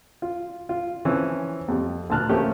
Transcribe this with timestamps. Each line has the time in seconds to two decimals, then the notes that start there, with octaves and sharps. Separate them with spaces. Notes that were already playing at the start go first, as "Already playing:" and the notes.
0.22 F4
0.69 F4
1.05 E3 F3 C4 C#4
1.68 F2 G3
2.10 D2 A#2 A5 F6 F#6
2.29 F3 A3 A#3 C#4 G4